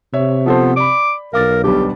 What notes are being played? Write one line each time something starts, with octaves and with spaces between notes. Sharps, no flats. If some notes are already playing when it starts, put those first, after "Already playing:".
C3 C#5 E5
F3 B3 A4 C5
D5 B5 D6
B1 A#4 F5 D6 A6
D2 B2 G3 G4